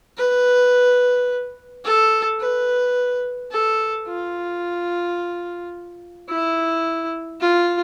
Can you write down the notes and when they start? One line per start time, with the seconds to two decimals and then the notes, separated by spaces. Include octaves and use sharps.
0.17 B4
1.85 A4
2.40 B4
3.51 A4
4.07 F4
6.29 E4
7.41 F4